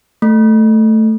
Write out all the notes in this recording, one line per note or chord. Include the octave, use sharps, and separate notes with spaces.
A3